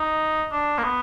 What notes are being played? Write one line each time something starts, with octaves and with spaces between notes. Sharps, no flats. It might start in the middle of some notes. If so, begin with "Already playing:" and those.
Already playing: D#4
D4
A#3
B3